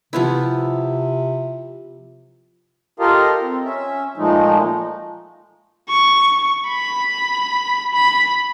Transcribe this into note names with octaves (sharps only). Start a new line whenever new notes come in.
C3 F3 B3 E4
F4 G4 A4 A#4 D#5 F5
C4
C#4 E5
A#2 F3 G#3 A3 D#4
C#6
B5
B5